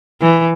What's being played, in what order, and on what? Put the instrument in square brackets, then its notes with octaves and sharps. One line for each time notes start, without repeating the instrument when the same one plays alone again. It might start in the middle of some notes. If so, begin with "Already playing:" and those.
[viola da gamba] E3